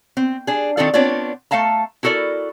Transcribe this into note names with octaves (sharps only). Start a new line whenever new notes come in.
C4
D4 G#4
D#3 C4 D4 F4 A4 D5
B3 C4 D4 F4 C#5 D5
A3 A4 F5 A5 A#5
E4 F#4 A4 A#4 D5